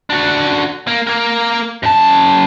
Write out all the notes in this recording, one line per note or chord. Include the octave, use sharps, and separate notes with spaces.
D4 F#4
A#3
A#3 A#4
F#2 A5